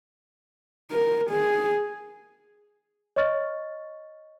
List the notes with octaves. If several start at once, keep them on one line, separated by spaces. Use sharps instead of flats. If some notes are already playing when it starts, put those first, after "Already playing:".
A#4
G#4
C#5 D#5 C#6 F6 A6